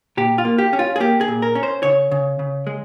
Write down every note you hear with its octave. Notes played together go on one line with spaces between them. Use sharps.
A#2 G4
F4
A#3
G4
C#4
F4
G#4
A#3 G4
G#4
A#2
A#4
C#4
C5
C#3 C#5
C#3
C#3
G#3